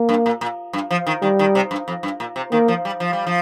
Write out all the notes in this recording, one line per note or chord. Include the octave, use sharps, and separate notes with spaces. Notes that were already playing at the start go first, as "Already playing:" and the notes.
Already playing: A#3
G2
A#2
A#2
G2
F3
D#3
D#3 G3
D#3
C3
G2
F2
G2
A#2
C3
D#3 A#3
F3
G3
F3
G3
F3